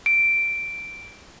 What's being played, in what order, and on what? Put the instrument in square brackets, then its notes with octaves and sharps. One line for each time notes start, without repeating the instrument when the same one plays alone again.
[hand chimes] D7